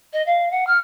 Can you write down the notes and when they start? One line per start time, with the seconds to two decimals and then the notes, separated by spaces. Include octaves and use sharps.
0.13 D#5
0.26 F5
0.51 F#5
0.67 F6